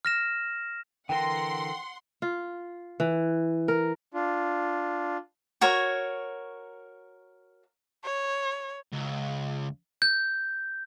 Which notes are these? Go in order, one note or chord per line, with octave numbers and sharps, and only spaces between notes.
F6 A#6 E7
D3 E3 A#4 F#5 G5 C6
F4
E3
A#4
D4 F4
F#4 A#4 C#5
C#5
C#2
G6